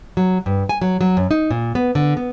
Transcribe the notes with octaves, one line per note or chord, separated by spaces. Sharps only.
F#3
G2
G#5
F#3
F#3
F#2
D#4
A#2
B3
D3
B3